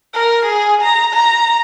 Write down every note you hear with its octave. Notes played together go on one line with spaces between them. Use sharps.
A#4
G#4
A#5
A#5